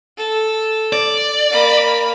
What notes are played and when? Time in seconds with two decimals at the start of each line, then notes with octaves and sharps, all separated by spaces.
0.17 A4
0.93 D5
1.51 A#3 B5